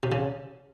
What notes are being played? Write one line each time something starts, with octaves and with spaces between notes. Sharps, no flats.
C3
C#3